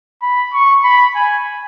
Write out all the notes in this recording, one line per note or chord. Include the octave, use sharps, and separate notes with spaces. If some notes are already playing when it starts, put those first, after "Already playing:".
B5
C#6
B5
G#5